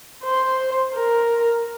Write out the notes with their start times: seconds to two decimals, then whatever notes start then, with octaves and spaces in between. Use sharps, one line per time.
0.24 C5
0.94 A#4